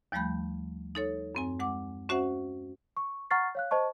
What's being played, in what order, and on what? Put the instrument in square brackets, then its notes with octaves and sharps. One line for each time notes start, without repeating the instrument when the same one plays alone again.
[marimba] D#2 F3 G3 A3 B5 G6
D#4 A4 C#5
F#2 C4 G#5
G#3 F#5 D6
C#4 F#4 C5 E5 F#5
[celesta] C#6
F#5 A#5 C#6 F6 A6 C7
C#5 F5 F#6
C5 D#5 A5 C#6